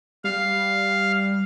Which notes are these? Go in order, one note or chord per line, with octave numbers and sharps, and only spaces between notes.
G3 F5